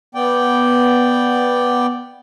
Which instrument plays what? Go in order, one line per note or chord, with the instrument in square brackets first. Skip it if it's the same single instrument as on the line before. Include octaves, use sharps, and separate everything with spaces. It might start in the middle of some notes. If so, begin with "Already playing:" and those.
[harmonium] B3 D5 G5